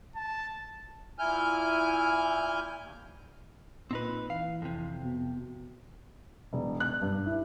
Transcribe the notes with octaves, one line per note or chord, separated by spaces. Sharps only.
A5
A#2 E4 G#5 F6 G6
D#2
A#2 C4 D#4 B4
E3 F5
F2 C3
B2
E1
F#6
G2
E4